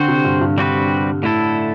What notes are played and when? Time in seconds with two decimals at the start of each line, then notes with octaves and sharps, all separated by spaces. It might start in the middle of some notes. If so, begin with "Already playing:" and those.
Already playing: D3 C4 F#4 C5
0.08 C3
0.25 G2
0.41 G2
0.57 G2 G3 C4 F#4 B4
1.23 A2 D3 A3 E4 A4